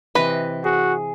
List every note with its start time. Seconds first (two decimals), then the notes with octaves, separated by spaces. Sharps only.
0.15 C3 E3 B4 D#5
0.64 F#4 G#4